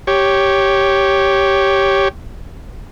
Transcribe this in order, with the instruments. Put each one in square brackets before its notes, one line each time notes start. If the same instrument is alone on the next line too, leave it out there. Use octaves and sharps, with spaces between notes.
[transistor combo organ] G4 C#5